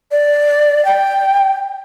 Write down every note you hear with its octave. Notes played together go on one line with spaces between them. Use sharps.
D5
G5